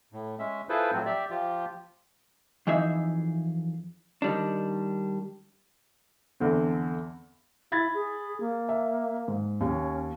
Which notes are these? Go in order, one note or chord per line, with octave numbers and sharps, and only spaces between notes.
A2
G#3 C#4 E5
E4 F4 G#4 A4 B4 C5
A2 F3 F#3 C4
G4 D5 E5
F3 F4 G4
F2 E3 D#4 G#4 E5
D#3 G3 D4
E2 D3 C4
E4 B5 G#6 A6
G#4
A#3
E5
G#2
D#2 C#4